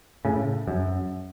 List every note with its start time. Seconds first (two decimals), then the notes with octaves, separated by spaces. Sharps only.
0.25 A2 C#3
0.68 F#2